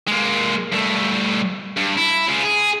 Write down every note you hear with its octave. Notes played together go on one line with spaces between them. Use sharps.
G#3 A#3
G2 A3
G2
E4
C#3 F4
G#4